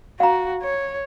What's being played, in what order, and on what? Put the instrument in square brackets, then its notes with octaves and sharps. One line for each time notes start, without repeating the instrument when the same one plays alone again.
[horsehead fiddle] F#4 [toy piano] F5 A#5
[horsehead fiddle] C#5